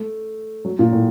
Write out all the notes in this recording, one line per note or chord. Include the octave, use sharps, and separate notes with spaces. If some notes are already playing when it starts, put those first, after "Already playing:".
Already playing: A3
F#3
A#2
A2